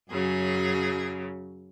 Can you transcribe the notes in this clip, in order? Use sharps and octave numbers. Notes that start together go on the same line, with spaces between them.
F#2 C#3 F#3 G#4